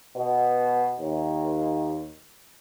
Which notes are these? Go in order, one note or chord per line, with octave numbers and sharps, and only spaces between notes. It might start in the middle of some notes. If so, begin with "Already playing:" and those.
B2
D#2